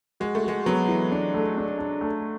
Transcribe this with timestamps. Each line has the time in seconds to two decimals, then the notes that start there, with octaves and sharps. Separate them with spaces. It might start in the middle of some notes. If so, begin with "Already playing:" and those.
0.20 G#3 F#4
0.35 A3
0.44 G#3 F#4
0.66 F#3 B3
0.88 E3
1.12 D4
1.34 A3
1.57 D4
1.79 D4
2.01 A3